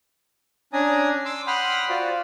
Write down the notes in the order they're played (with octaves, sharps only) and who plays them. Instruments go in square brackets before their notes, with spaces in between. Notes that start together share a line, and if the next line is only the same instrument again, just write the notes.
[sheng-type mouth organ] C#4 D4 D5 G#5 A#5 D#6
C6 D6 E6
F#5 G5 B5 C6 D#6 F6
F4 F#4 C5 D5